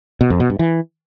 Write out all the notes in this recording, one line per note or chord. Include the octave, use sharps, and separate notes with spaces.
B2
F2
B2
G2
E3